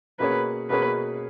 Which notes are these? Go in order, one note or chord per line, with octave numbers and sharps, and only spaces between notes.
B2 A#3 C#4 G#4 B4 C#5
B2 A#3 C#4 G#4 B4 C#5